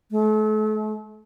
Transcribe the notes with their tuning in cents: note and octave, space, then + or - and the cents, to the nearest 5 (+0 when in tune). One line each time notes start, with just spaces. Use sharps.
A3 -40